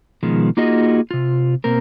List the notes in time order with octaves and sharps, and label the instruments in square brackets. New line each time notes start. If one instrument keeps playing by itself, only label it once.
[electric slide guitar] B2 D#3 F3 G#3
A#3 D#4 F4 F#4 G#4 D#5
C3 F4
B2 A#3 C4 A#4